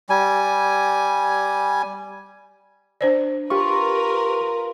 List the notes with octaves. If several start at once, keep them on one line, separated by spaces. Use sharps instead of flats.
G3 G#5
D4 C5 D5
F4 G4 A#4 B4 C#6